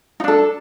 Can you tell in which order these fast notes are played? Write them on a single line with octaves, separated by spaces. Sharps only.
D#4 D4 A4